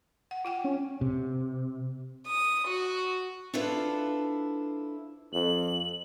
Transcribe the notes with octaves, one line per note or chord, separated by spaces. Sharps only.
F#5
F4 F#5 G5
C#4
C3
D#6
F#4
D4 E4 F4 A4 B4 C5
F2 F#7